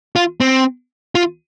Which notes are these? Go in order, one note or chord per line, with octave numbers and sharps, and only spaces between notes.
F4
C4
F4